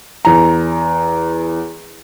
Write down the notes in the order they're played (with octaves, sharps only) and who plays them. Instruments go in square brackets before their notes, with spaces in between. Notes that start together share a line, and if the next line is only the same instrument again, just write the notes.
[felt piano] E2 A#5